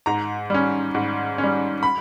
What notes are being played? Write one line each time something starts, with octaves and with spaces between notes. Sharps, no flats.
G#2 A#5
G3 C#4
G#2
C#4
G3
B5